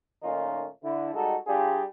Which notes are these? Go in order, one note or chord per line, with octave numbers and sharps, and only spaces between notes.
A#2 D#3 A3 C#4 D#4 F4
D3 E4
G3 G#3 D#4 F#4 A4
G3 D4 F4 G4 G#4